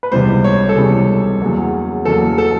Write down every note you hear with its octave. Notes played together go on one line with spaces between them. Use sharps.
B4
C#2 C3 E3 G3 B3 C5
C#5
A4
C#2 C3 E3 G3 B3 G#4
E2 C#3 F#3 A#3
E2 C#3 F#3 A#3 A4
A4